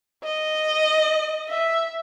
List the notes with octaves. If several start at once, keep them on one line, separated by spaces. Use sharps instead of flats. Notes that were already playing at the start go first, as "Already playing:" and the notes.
D#5
E5